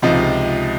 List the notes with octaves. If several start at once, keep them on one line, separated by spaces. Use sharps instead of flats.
C#2 C3 F3 D#4